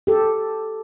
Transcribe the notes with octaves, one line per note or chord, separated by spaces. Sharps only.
G4 A4